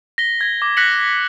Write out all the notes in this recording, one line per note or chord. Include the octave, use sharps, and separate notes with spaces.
A#6 B6 G7
G#6 A#6 B6
D6 A#6
F#6 A#6 B6 C#7 F#7